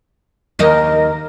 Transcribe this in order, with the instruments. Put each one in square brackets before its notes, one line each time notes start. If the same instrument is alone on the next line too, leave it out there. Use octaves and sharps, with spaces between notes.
[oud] D#2 D#4 D#5 [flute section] A#4